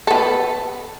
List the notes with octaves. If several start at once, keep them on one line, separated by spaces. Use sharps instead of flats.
B3 A4